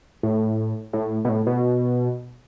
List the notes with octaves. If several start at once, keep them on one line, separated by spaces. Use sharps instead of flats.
A2
A2
B2
A2
B2